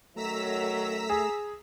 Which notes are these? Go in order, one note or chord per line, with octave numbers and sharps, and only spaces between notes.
F#2 D#3 F#3 A3 A#5 E6 B6
G#4